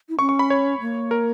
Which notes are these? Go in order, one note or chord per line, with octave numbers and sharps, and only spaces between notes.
E4
C#4 C#6
C#6
B5
C#5
A#3
A#4